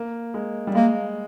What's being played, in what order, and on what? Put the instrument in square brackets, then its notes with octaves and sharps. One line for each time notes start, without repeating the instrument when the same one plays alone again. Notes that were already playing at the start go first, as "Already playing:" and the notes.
Already playing: [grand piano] A#3
G#3
G3
[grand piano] G#3 [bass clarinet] A#3